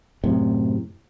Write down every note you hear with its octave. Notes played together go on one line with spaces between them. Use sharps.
F#2 A2 C3